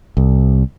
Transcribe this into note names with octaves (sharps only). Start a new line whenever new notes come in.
C2